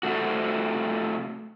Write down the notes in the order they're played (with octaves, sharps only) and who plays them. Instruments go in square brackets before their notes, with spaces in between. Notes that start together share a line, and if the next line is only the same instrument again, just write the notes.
[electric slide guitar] C3 A3 F#4